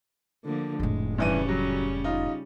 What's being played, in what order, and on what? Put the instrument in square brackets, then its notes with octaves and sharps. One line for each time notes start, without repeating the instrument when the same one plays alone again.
[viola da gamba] D3 F3 A#3
[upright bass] F1 A2 [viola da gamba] G#3
[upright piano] G2 E3 D#7 [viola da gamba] C#3 G3 C#4
[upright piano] F#3
D#4 F4